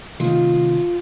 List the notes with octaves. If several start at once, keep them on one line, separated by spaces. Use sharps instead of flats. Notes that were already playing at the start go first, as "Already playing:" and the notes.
C3 D#3 A3 F4